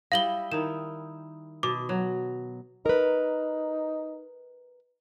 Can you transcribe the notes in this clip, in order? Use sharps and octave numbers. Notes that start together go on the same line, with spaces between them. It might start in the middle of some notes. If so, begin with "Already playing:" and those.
G3 E4 D#5 F5 F#7 G7
D#3 D#4 E4 E7
B2 D6
F#3
D#4 A#4 B4